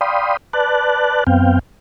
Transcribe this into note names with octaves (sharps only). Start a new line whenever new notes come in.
D5 F5 G5 B5 C6 D#6
B4 D5 A5 F#6
F#2 B3 C4 F5 G5